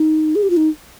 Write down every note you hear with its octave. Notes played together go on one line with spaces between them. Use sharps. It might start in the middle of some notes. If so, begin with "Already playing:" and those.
Already playing: D#4
G#4
G4
F4
D#4